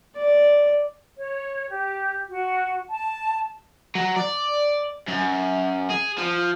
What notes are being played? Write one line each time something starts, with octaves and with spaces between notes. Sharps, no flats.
D5
C#5
G4
F#4
A5
F#3
D5
F#2
G#4
F3